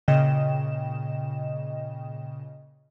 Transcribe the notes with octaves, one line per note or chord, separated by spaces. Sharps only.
A#2 C#3 D#5 G5 E7